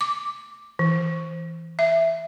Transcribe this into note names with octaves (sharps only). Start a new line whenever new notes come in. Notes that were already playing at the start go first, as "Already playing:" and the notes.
D6
E3
E5